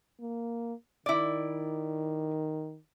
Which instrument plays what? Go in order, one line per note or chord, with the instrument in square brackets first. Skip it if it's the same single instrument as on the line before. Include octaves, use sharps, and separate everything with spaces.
[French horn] A#3
[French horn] D#3 [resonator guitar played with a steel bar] E4 D5